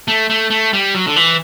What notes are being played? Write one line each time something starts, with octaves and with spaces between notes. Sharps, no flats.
A3
A3
A3
G3
F#3
D3
E3